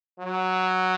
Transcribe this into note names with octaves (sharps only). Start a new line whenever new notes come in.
F#3